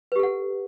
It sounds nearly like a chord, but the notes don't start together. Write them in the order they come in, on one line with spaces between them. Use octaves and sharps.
B4 G4 A4 F#5